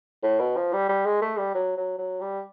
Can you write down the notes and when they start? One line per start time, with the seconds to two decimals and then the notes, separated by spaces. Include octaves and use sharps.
0.23 A2
0.40 B2
0.57 F3
0.73 G3
0.89 G3
1.06 G#3
1.22 A3
1.38 G3
1.54 F#3
1.77 F#3
1.98 F#3
2.21 G3